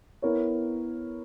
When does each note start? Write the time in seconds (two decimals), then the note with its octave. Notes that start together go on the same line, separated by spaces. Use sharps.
0.22 B3 E4 A#4 C#5